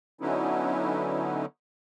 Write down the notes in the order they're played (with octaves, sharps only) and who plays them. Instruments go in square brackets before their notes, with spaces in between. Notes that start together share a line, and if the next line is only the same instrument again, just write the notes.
[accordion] D3 F#3 B3 C#4 D#4 E4